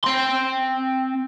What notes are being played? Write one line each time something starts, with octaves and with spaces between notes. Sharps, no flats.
C4 C6